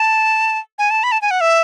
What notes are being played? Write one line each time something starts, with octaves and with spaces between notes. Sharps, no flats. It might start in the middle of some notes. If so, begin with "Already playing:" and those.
Already playing: A5
G#5
A5
B5
A5
G#5
F#5
E5